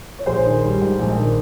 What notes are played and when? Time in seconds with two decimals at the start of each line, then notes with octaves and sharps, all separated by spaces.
0.19 C#5
0.26 A#1 G#4 C5
0.45 D#3
0.64 G3
0.81 G#2
0.99 A#1
1.17 D#3